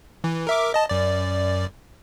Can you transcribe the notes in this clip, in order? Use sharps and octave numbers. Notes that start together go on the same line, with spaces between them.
E3
A#4 E5 D6
D#5 A5
F#2 D5